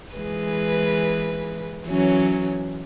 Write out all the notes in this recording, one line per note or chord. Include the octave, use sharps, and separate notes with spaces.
E3 G#3 B4
E3 F#3 C#4